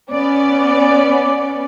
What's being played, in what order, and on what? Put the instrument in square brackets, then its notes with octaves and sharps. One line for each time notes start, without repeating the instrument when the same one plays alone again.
[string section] B3 C#4 D5